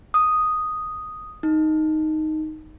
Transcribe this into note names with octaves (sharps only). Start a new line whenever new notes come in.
D#6
D#4